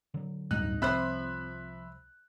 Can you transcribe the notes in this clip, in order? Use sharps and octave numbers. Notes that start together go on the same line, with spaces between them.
D3 F#3
D1 G2 G#3 D#4 F#6
C2 F3 C4 C5 E5 B5 F#6